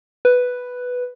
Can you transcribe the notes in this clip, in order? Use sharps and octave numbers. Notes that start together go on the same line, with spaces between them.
B4